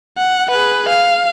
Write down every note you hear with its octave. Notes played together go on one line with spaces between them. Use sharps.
F#5
G#4 B4
F5